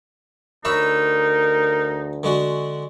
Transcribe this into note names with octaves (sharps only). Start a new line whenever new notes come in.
D2 D#4 A#4 C#5 E5 B5
D3 G#3 F#4